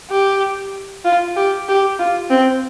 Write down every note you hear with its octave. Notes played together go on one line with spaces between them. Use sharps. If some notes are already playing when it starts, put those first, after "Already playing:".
G4
F4
G4
G4
F4
C4